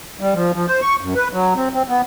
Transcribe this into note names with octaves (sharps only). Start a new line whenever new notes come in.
G3
F3
F3
C5
C#6
F#2
B4
F#3
C4
C4
B3